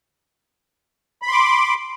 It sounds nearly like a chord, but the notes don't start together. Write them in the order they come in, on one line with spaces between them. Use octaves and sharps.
B5 C6 D6